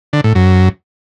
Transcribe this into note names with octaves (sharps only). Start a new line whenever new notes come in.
D3
A2
F#2